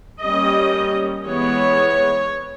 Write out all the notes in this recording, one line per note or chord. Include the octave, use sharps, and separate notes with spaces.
G3 A#3 C#4 D#5
E3 G#3 B3 C#5